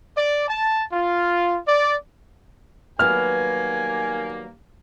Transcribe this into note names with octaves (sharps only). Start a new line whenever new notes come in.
D5
A5
F4
D5
D#3 F#3 G3 A#3 B3 G#5 F6